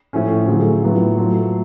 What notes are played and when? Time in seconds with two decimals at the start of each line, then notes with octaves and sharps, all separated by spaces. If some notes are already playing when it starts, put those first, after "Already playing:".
0.13 A2 F3 A3 C#4
0.48 D3 F#3 A3 F4 G#4
0.83 A2 F#3 B3 F4
1.18 F#3 A3 F4 A4